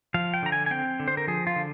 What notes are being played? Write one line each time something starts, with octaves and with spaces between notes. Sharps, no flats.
F3 F5
G5
D3 A#5
G#5
G#5
C4 G5
D3
C5
A#4
F3 G#4
F4
D3